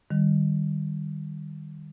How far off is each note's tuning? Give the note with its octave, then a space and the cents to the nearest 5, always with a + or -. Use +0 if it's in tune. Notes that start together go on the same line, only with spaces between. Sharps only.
D#3 -25 G3 +0